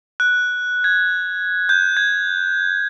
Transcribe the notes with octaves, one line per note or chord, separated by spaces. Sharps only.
F#6
G#6
G6
G#6